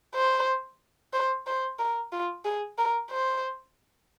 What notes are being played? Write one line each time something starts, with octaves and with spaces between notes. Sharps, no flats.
C5
C5
C5
A#4
F4
G#4
A#4
C5